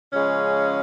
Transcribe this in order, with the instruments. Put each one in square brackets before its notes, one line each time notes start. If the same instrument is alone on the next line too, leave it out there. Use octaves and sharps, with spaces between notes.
[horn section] C#3 F3 G#3 C#4